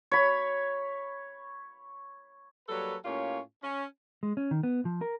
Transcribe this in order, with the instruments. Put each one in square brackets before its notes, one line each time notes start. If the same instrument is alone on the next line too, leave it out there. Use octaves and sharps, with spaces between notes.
[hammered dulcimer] C#5 B5
[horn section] F#3 G3 A#3 A4 B4 C#5
A2 A#3 C#4 F4 G4 C#5
C#4
[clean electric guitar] G#3
C#4
D#3
B3
F3
A#4